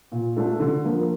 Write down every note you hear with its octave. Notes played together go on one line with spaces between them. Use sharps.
A#2
A3 D4 F4 A4
D3
F3 A#3